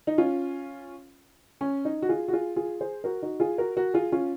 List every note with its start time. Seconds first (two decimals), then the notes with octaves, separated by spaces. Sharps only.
0.07 D#4
0.18 C#4 F4
1.61 C#4
1.85 D#4
2.02 F#4
2.09 F4 G#4
2.28 F#4
2.33 F4 G#4
2.56 F4 G#4
2.81 G#4 C5
3.04 F#4 A#4
3.22 D#4 F#4
3.40 F4 G#4
3.58 F#4 A#4
3.77 F#4 A#4
3.94 F4 G#4
4.12 C#4 F4